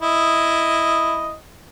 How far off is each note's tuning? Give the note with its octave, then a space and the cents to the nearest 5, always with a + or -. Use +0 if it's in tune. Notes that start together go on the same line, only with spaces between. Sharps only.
E4 +0 D#5 +0